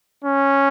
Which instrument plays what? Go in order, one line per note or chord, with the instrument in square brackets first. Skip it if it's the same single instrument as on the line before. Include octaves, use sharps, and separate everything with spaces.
[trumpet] C#4